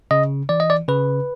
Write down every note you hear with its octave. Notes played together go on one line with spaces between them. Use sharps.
C#3 D#5
E3 D5
D#5
D5
C#3 B4